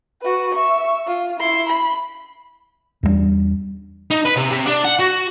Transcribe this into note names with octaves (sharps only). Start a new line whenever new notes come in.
F#4 B4
E5 C#6
F4
E4 C6
B5
E2 G2 G3 D4
D#4
B4
C3
C3
D4
F#5
F#4